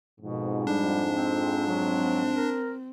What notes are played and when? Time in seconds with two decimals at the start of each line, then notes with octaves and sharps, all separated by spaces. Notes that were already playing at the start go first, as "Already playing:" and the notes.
0.21 F2 G#2 B2
0.67 G3 D4
1.16 C4
1.67 F#3 C4
2.36 A#4